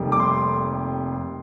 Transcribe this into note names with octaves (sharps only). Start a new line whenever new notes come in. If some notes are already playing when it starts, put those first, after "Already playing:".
Already playing: F1 F2 D#3 G3 A#3
D6
C6